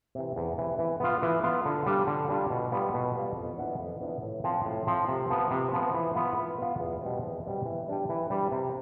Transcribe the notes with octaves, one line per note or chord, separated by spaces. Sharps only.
C3 E3
E2
C3 E3
E3
B3 F4
E3
B3 F4
D3
G3 D4 F4
D3
G3 D4 F4
B2
G3 B3 F4
B2
G3 B3 F4
F2
E3 B3 D4
F2
E3 B3 D4
A2
F3 C4
A2
F3 C4
C3
F3 B3
C3
F3 B3
E3
B3 F4
E3
B3 F4
E2
B2 G3 C4
E2
B2 G3 C4
E3
G3 D4 G4
E3
G3 D4 G4
C3